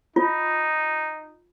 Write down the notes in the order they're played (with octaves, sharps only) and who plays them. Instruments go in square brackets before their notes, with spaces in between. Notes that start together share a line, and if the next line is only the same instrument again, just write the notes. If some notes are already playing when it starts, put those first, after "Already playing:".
[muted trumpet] D#4 [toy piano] F4